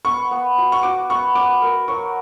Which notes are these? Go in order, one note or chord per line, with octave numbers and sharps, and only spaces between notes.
B3 C#6
B3
F#4
C#6
F#4 D6
B3 C#6
B4 D6
A#4
F#3 C#6